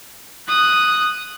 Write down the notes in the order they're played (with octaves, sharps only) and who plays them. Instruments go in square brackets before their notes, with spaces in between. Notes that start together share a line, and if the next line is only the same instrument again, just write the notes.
[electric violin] D#6 F#6